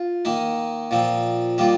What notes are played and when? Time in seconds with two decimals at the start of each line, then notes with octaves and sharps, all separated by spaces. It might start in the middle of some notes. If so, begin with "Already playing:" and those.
Already playing: F4
0.25 D#3 A#3 D#4
0.91 A#2 F3 C4
1.58 D#3 G3 A#3 F4